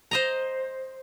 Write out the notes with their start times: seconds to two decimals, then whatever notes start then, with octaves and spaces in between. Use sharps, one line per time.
0.11 C5 D#5 A#5